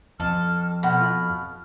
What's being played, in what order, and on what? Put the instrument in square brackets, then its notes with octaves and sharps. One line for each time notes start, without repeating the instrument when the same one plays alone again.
[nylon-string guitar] F2 [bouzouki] A4 [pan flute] F6
[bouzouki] B2 [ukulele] A#4 C5 F#5 [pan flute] F6
[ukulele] F4 B5